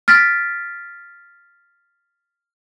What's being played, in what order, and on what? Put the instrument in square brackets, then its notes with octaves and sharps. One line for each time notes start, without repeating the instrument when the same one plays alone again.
[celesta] F6 A6 B6 D7